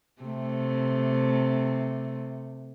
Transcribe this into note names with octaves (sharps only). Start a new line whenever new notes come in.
C3 A3